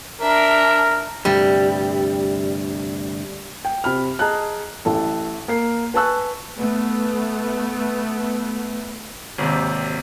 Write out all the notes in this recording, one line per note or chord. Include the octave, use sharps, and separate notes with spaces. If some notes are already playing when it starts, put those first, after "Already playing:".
D4 A#4 E5
D2 G2 C3 G3
G5
C3 B5 F6
G#4 D#5 A5 A#5 F#6
A1 E4 A4 A5
A#3 C7
B4 G#5 A5 C#6 E6 F#6
A3 B3
G#1 D#2 C3